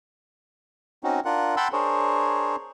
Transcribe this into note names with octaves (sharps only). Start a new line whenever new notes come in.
C4 C#4 D#4 F#4
D4 F4 A#4 F#5
F#5 G5 A5 B5 C6 E6
D4 G#4 A#4 C5 C#5